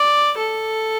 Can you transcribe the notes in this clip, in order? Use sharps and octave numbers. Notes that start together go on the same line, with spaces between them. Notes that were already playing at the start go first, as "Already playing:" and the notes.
Already playing: D5
A4